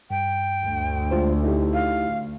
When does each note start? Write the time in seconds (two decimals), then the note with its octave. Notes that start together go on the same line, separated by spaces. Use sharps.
0.10 G2 G5
0.64 D2
1.11 G#3 F4 C5
1.44 D#4 E4 G4
1.74 F5